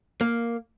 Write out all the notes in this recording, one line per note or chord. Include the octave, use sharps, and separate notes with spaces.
A#3